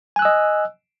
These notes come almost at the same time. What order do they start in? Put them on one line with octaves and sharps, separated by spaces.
G#5 F#6 E6 D#5